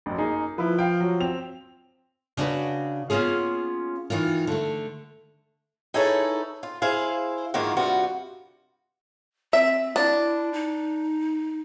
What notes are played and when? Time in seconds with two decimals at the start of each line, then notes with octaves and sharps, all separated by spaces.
0.06 A1 F#2
0.18 A#3 D#4 G#4
0.58 F3 E4 B4
0.79 F5 G5
1.01 F#3
1.20 C4 F7
2.37 C#3 D4 F#4 B4
3.10 A#3 B3 C#4 F4 G#4
4.10 D#3 E3 A#3 F4
4.47 D3 A3
5.94 D#4 E4 G#4 A4 B4 C#5
6.63 F4
6.82 E4 G#4 C5 F5
7.54 G#2 D#3 E3 A#3 F4 F#4
7.77 G2 C3 F4 F#4 B4
9.53 C4 E5
9.96 D4 E4
10.53 D#4